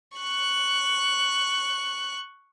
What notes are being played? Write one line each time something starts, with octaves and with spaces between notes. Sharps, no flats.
C#6 F#6